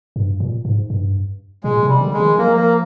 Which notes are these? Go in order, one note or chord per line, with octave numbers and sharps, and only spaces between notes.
G2
A#2
G#2
G2
A#2 G#3
C3
G3
D3
G#3
D#3
F3 A#3
A#3